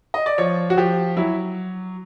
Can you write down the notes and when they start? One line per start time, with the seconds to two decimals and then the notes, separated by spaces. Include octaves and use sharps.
0.14 D#5
0.26 D5
0.38 F3 C#5
0.70 F#4
0.77 F3 G4
1.17 F#3 E4